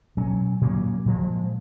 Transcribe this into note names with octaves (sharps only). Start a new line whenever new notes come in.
B2 F#3 C#4
A#2 F#3 A#3 C#4
A#2 F3 G#3